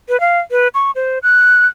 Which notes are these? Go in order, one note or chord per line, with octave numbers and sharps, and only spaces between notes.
B4
F5
B4
C#6
C5
F#6